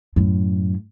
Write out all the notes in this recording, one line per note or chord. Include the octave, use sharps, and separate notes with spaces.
F#2 A2